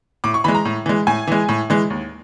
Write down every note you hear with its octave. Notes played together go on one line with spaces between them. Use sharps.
A2 D6
C#6
E3 G#3 B5
A#5
A2
E3 G#3
A2 G#5
E3 G#3
A2
E3 G#3
D#2